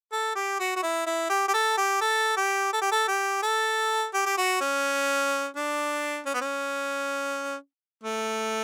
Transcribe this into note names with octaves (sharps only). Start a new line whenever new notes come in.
A4
G4
F#4
F#4
E4
E4
G4
G4
A4
G4
A4
G4
A4
G4
A4
G4
A4
G4
G4
F#4
C#4
D4
C#4
B3
C#4
A3